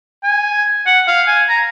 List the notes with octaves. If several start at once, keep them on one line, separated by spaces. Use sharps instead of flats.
G#5
F#5
F5
G#5
A#5